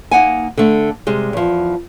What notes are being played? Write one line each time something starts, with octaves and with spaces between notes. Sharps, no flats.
A#3 D#4 F#5 G#5
D3 A3
C3 G3 G#3
E2 F3